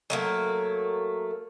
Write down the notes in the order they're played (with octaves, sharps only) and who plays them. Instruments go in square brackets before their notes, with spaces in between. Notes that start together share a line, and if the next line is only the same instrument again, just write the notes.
[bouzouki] F#3 A3 A#3